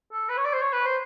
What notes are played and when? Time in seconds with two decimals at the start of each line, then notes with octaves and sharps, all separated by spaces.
0.12 A4
0.29 B4
0.37 C#5
0.45 D5
0.53 C5
0.61 C#5
0.73 B4
0.85 C5